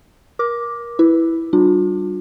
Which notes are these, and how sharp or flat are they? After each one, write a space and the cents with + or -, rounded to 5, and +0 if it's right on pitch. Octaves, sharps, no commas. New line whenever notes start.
A#4 +25 D6 +0
E4 +0 B4 +0
G3 -25 D4 +30 F4 +45